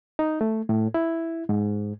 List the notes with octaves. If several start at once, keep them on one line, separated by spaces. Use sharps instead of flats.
D#4
A3
A2
E4
G#2